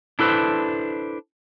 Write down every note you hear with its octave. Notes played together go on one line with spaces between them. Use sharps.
D4 E4 A4 B4 C5